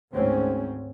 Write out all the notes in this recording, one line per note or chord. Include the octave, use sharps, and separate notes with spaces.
G#1 D2 G#2 C4 C#4